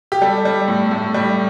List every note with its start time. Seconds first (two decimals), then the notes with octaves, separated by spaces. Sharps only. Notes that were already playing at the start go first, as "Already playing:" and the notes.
0.12 G4
0.21 G3 A4
0.45 G3
0.68 A2
0.91 A2
1.14 G3